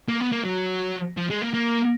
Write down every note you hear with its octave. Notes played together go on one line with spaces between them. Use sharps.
A#3
B3
A#3
F#3
F3
G#3
A#3
A#3